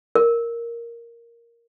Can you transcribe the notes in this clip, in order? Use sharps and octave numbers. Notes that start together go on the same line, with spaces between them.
A#4